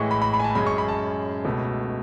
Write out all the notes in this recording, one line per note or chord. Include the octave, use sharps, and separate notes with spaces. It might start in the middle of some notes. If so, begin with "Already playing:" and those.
Already playing: A2 E3 G#3 C#6
B5
B5
B5
G#5
A5
F#2 C#3 G#3 B5
C#6
B5
A5
C#2 B2 A3